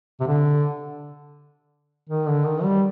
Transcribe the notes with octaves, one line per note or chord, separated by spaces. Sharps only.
C3
D3
D#3
D3
D#3
G3